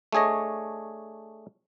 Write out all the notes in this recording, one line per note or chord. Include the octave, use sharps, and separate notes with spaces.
A3 D4 G#4 C#5 D#5